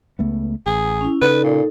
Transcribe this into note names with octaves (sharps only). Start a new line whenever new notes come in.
C#2 A3 B3
A1 G#4
C#4 E4
C#3 D#4 A4 B4 D5
A#2